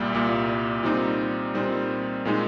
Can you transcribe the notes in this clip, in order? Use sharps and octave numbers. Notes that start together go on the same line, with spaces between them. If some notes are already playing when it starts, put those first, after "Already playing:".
Already playing: C2 A#2 G3 A#3
C2 A#2 G3 A#3
A#2 G3 C4 D#4
A#2 G3 C4 D#4
A#2 G#3 D#4